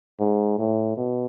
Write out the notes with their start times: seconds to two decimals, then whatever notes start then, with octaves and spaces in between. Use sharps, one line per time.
0.19 G#2
0.59 A2
0.97 B2